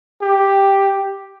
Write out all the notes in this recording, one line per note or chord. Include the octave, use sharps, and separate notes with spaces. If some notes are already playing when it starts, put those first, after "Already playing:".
G4